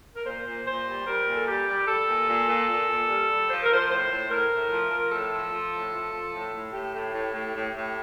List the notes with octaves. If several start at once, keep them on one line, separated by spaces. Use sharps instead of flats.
A#4
A#2 C5
A#2
A#2 C5
G3
G3 A#4
A#2
A4
G3 G4
G3
G3 A4
A#2
A#2
A#2
A#2
A#2
G3
G3
F3 C5
A#4
F3 C5
A2 C5
A2
A2 A#4
A2
F3
F3
A2 A4
F3
F3
A2
F3
F3
A2
A2
A2 G4
A2
A2
A2
A2
A2